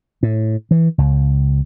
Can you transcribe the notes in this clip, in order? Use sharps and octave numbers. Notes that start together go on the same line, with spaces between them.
A2
E3
C#2